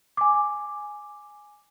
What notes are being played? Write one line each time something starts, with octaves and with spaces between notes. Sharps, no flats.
G#5 D6